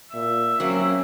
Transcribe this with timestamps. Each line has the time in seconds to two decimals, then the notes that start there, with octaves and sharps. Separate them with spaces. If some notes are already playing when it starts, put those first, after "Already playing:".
0.14 A#2 E5
0.60 F#3 A#3 C4 C#4